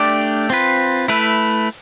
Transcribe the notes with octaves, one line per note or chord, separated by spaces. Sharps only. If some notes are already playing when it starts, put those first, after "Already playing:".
Already playing: A3 D4 G4 D5
C4 F4 B4
A3 E4 B4